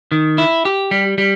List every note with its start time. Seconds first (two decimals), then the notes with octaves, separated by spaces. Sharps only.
0.12 D#3
0.38 E4
0.65 G4
0.91 G3
1.18 G3